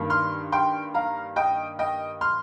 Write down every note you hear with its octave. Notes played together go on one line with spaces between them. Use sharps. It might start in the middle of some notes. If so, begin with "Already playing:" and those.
Already playing: G2 D#3 A#3
C6 F6
G5 C6
F5 A#5
D#5 G5
D#5 G5
C6 F6